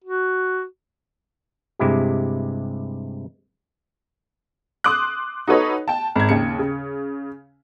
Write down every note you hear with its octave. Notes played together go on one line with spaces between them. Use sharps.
F#4
G2 C3 G#3 E4 G4
C6 D6 D#6 F#6
D#4 F#4 A4 B4 C#5 D#5
G5 A5
G#1 G#6
D#2 C#3 C#7
C#3